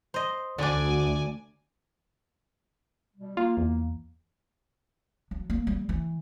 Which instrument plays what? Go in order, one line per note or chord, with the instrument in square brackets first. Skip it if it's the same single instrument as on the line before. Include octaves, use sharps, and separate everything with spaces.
[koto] C5 D#5
[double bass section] D2 [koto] D3 D4 [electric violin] D5 G#5
[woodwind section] B2 G3
[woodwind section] A#3 [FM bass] F4
[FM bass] E2
[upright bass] F#3
A#3
G3
E3